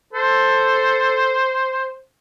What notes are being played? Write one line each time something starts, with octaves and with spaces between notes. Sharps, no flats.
A4 C5